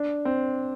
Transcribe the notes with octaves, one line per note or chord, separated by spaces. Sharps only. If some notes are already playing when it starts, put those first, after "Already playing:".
Already playing: D4
C4